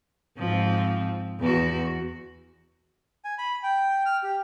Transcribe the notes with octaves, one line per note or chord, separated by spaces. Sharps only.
G#2 F3 C4
E2 F#4
G#5
B5
G5
F6
G4